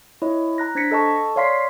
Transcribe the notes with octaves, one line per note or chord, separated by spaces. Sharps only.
E4 C#5 D#5
A#5 F#6 A#6
D4 C5 G#6 A#6 B6 C#7
A4 D#5 A5 C#6
C#5 D5 F5 C6 B6 C7